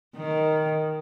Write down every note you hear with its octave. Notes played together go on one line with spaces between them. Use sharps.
D#3